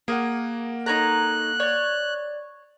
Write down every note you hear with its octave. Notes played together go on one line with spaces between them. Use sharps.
A#3 G#4 A#4 F#5
D#4 A4 C#5 A#5 F#6
C#5 D5 A6